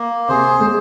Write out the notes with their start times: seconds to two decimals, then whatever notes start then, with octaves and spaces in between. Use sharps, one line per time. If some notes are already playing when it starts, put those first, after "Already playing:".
Already playing: A#3
0.28 C3 G#4 C5
0.60 G#3